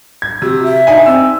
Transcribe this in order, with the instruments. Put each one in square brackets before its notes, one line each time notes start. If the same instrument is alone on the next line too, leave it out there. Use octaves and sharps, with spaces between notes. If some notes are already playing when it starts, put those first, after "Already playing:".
[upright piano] G#6
[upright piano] C3 [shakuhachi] F#4
[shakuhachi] E5
[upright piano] D4 D#4 G#5
[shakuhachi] C4 [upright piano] E6